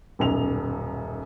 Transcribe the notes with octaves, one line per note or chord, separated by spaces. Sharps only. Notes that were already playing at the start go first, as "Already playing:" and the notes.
D#1 B1 F#2 F7